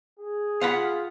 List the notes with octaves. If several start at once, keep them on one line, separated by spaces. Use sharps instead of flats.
G#4
F4 F5 F#5 B5